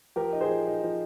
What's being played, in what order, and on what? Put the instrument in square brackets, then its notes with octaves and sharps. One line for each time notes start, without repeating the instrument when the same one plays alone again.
[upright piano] F3 G4 A#4
D#4
G#4 C5
F3
D#4
F3